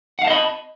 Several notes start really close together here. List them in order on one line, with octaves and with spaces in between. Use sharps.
F#5 F5 A5 D#5 B5